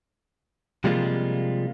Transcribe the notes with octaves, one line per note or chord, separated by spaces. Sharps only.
C3 F3 G3 G#3 A#3 F4